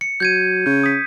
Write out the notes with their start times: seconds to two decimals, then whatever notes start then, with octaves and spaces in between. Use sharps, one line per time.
0.01 C#7
0.20 F#3 G6 G#6 D#7
0.66 C#3 G6
0.83 D#6 B6